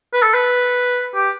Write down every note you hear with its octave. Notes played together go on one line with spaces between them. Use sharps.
B4
A4
B4
G4